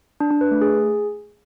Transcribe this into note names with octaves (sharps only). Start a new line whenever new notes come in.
D4
D4
B4
A3
G#4